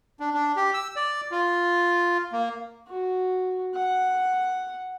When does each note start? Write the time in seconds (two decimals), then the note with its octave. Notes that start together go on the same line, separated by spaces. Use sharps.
0.20 D4
0.34 D4
0.56 G4
0.74 E6
0.96 D5
1.31 F4
2.32 A#3
2.88 F#4
3.74 F#5